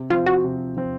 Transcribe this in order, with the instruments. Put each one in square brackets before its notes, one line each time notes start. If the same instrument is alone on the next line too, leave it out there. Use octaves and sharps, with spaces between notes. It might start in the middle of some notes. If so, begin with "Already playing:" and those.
Already playing: [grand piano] C3
[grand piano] F3 C4 [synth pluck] F4
[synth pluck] F#4
[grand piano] C3
F3 C4